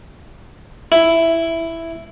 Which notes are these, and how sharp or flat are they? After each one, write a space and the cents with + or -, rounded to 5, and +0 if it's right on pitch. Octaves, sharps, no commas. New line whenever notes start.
E4 +5